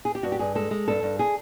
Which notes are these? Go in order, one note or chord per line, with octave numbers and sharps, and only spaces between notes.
G#4
G4
G2 F#4
G4
G2 G#4
G#3 A4
G#3
G2 A4
G2
G#4